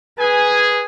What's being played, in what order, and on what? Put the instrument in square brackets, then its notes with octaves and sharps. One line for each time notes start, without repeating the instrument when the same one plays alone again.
[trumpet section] G#4 G#5 [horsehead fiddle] B4